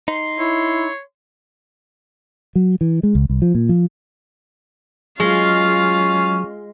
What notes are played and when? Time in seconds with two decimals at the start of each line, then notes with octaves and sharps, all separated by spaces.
0.08 D#4 C6
0.39 E4 C#5
2.56 F#3
2.81 E3
3.03 G#3
3.15 C#2
3.30 C2
3.42 F3
3.55 A#2
3.69 F3
5.20 F#3 G#3 C#4 F4 F5